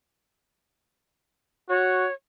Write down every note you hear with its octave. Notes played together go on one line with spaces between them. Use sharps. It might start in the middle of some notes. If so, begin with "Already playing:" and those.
F#4 C#5